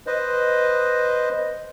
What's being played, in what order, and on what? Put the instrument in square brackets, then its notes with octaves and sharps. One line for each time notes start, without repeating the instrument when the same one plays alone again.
[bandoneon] B4 C5 D#5